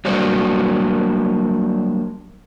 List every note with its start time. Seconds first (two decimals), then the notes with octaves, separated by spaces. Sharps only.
0.05 F#3 G3 A#3 D4 F#4 C5